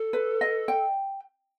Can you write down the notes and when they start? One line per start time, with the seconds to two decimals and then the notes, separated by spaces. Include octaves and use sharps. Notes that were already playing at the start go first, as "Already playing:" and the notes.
Already playing: A4
0.13 B4
0.41 D#5
0.68 G5